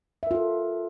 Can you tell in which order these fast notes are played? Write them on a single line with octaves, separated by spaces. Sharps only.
E5 A#4 F4 A4